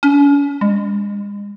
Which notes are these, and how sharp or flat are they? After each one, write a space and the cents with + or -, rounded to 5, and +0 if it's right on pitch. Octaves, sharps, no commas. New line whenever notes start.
C#4 +40
G#3 -35